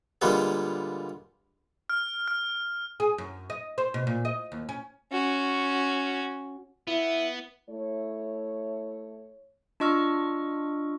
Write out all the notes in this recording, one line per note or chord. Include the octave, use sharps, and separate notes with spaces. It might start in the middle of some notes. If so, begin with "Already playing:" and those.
A#2 D3 G3 G#3 A#3 B3
F6
F6
G#4
F#2
D#5
C5
B2
A#2
D#5
D#2
C#4
C#4 F#4
B3 E4
A3 E4 C#5
D4 F4 D#5 C#6 E6 F6